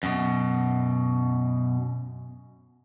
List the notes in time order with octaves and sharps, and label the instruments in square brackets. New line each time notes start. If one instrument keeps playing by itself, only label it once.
[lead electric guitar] F#2 B2